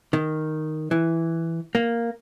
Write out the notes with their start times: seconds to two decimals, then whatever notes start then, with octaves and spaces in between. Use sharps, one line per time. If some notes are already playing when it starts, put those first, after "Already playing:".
0.13 D#3
0.91 E3
1.75 A#3